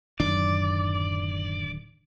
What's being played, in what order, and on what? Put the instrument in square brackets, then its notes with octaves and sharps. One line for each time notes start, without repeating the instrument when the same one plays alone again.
[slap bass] D1 D#3 D4 [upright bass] F#2 [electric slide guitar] D5